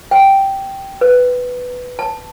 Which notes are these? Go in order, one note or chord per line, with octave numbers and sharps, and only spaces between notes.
G5
B4
A5